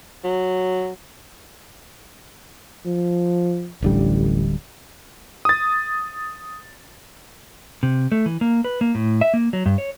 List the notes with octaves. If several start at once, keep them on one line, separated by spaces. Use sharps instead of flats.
F#3
F3
D1 A1 D3 G3
D#6 A6
C3
A3
E3
A#3
B4
A#3
A2
E5
A#3
F#3
G2
C#5